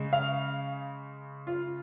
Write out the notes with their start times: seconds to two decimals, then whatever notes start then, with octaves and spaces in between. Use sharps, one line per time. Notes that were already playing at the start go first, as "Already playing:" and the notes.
Already playing: C#3 G#3
0.13 F5
1.47 F4